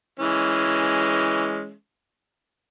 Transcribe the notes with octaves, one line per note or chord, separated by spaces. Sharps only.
E3 G#3 C#4